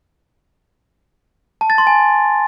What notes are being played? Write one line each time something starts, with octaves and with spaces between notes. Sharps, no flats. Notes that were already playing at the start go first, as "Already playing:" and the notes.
A5
A6
C6
G#5